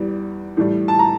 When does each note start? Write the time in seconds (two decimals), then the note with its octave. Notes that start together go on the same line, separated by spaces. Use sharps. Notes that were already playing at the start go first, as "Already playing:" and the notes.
Already playing: E2 E3 G3
0.57 A2 E3 G3
0.88 A5
0.99 A#5